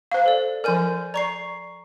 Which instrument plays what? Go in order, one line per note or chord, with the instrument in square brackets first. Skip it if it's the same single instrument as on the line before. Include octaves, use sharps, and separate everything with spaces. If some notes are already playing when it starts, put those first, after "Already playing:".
[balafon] C5 F5
[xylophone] A4 D5
[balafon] F3 A#4 [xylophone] D5 G#5 G6
[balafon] D5 [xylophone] A#5 C#6 C7